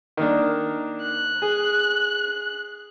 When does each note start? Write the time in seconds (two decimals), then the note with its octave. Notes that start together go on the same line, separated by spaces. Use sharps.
0.17 D#3 A#3 D4
1.03 F#6
1.42 G#4